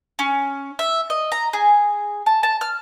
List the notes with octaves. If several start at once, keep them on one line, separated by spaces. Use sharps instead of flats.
C#4
E5
D#5
A#5
G#4
A5
A5
F6